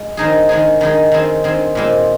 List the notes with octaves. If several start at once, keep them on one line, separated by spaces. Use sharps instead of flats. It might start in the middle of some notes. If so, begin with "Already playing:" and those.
Already playing: G#3
D#3 C4 D#4 G#4
D#3 G#3 D#4 G#4
D#3 G#3 D#4 G#4
D#3 C4 G#4
D#3 C4 G#4
A#2 G#3 C4